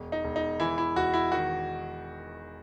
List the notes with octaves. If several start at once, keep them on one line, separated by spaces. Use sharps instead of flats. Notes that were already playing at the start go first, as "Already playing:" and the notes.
Already playing: E1
D#4
E1
D#4
E3 E4
E4
E1 F#4
E4
D#3 F#4